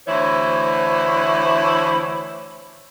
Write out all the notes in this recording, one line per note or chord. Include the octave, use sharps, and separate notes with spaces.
D2 E3 E4 C5 C#5